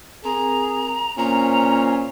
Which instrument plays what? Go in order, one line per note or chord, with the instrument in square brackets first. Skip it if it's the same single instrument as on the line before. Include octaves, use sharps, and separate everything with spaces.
[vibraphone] C4 A#4 [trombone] G#4 [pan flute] A#5
[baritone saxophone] A#2 [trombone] C#4 [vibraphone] C5 [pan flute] A#5